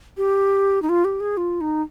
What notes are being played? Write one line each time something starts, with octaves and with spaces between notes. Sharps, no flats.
G4
D#4
F4
G4
G#4
F4
D#4